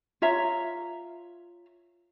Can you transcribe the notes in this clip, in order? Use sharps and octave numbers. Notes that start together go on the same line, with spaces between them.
F4 C#5 E5 A#5